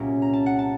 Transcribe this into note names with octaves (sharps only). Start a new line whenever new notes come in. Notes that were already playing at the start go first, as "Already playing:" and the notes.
Already playing: C2 A#2 F#3 A#3 C#4
A#5
A5
F#5
A5